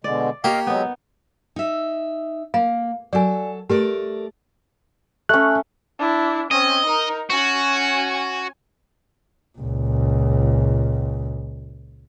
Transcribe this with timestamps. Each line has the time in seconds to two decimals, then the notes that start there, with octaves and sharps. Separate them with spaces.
0.04 B2 D3 G#3 D5
0.44 A#3 G4 C#5 D#5 F5
0.67 F#3 G#3 B3 D#4
1.56 D#4 E5
2.54 A#3 F5
3.13 F#3 A4 D5 G#5
3.70 A3 G4 A#4 D5
5.29 A3 C#4 F#6
5.99 D4 E4
6.51 C4 C#4 D#5
6.86 D#4 A#4
7.30 C#4 F#4 G#5
9.59 C#2 A#2